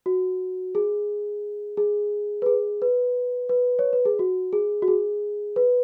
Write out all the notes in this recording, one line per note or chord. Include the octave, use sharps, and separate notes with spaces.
F#4
G#4
G#4
B4
G#4
B4
B4
C#5
B4
G#4
F#4
G#4
F#4
G#4
B4